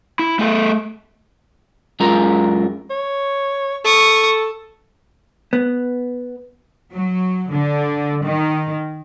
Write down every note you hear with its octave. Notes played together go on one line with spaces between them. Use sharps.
E4
A3 G#4 A4
F#2 G#3 F4 A#4 A#5
C#5
A4 C#6 D#6
B3
F#3
D3
D#3